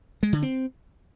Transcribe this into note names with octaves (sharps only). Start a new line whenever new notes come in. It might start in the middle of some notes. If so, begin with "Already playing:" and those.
G#3
D3
C4